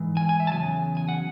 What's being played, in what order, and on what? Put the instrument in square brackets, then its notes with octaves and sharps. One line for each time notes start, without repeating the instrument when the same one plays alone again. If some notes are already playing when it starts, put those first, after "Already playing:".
Already playing: [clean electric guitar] G#2 E3
G#5
G#5
E5
A5
E2 C#3 F#3 G#5
G#5
F#5